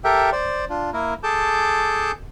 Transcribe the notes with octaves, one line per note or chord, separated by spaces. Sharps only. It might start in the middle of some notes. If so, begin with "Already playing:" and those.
G4 A4 A#4 E5 G5
C5 D5
D4 F4
A#3 E4 A#4
G#4 A4 A5 D6 G6